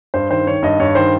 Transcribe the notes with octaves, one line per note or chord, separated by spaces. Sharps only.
G2 C5
D#3 C5
D#3 C#5
G2 D#5
G2 C#5
D#3 C5